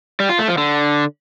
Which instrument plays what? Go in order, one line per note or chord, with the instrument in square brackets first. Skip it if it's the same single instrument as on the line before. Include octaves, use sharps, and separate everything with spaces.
[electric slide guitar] G3
F4
A3
F3
D3